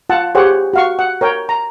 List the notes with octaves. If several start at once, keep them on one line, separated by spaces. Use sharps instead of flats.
F4 F#5 A5
G4 G#4 C5 C#5 F#5
F#4 F5 C#6
F#5
A#4 C#5 G5
A#5